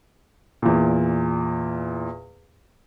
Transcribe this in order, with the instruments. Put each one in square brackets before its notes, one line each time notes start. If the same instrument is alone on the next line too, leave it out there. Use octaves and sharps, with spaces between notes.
[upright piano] E2 A#2